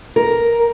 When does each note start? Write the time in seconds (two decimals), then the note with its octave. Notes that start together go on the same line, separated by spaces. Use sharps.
0.16 A#4